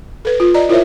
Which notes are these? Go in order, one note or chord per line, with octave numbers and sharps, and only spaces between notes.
A4 B4
F4
D5 D#5 A#5
E4 F4 A#4 C5 C#5 E5